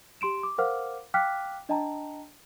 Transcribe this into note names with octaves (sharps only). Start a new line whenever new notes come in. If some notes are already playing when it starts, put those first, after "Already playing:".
G4 C6 D7 E7
D6
A#4 C5 F5 F#5 D6 F6
F5 G5 D6 F6 F#6 B6
D4 D#5 G5 A5 A#5